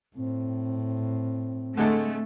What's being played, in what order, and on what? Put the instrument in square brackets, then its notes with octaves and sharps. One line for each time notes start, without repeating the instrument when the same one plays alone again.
[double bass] A2 [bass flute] C4
[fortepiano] D3 G#3 A4 [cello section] A3